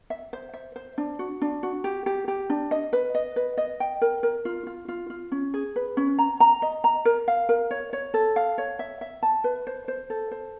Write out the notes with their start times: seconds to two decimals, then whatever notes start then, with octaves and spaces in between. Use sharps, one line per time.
0.10 E5
0.33 C5
0.54 E5
0.76 C5
0.98 D4
1.19 F#4
1.42 D4
1.63 F#4
1.84 G4
2.06 G4
2.28 G4
2.50 D4
2.71 D#5
2.93 B4
3.15 D#5
3.36 B4
3.57 D#5
3.80 G5
4.01 A#4
4.23 A#4
4.45 F4
4.67 F4
4.88 F4
5.10 F4
5.32 C#4
5.54 G#4
5.76 B4
5.97 C#4
6.19 A#5
6.40 A#5
6.62 D#5
6.84 A#5
7.05 A#4
7.28 F5
7.49 A#4
7.71 C#5
7.93 C#5
8.14 A4
8.36 F5
8.58 C#5
8.79 E5
9.01 E5
9.23 A5
9.44 B4
9.67 C5
9.88 C5
10.10 A4
10.31 C5